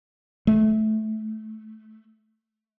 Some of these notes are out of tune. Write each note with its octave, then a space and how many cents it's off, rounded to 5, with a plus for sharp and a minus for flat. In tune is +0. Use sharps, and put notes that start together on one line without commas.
A3 -15